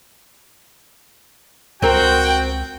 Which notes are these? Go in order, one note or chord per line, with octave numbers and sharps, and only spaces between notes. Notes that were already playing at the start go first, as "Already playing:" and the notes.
C#2 C4 F#4 A#4 G5